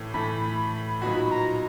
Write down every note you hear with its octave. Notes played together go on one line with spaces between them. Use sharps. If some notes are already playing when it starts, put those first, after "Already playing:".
Already playing: A2 E3 A3
A2 E3 A3 B5
A#2 F#3 B3 D#4 F#4 B5
A#5